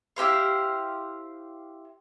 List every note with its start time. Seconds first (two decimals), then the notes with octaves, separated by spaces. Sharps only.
0.16 E4 G4 C5 F5